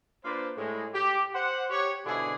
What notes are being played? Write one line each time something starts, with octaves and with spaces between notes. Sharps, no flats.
A#3 D4 F4 B4 C5
A2 G#3
G4
C5 F#5
G4 C#5
G#2 B2 D3 D4 E4 G#4